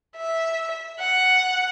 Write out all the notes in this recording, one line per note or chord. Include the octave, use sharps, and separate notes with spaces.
E5
F#5